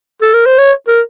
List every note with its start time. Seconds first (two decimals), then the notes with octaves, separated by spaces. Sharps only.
0.22 A4
0.34 A#4
0.46 C5
0.58 C#5
0.88 A#4